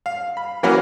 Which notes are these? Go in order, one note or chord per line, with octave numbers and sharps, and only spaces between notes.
F5
B5
E3 F#3 A#3 C#4 F#4 B5